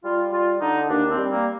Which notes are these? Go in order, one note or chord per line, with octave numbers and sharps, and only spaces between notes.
G3 F4
G3 F4
D3 D#4
D#2 D4
C4
G3
A#3